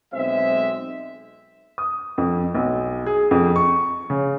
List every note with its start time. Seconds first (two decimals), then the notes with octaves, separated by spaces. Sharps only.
0.13 B1 G#3 C4 E5
1.78 D#6
2.18 F2
2.55 B1
3.06 G#4
3.31 F2
3.56 C#6
4.10 C#3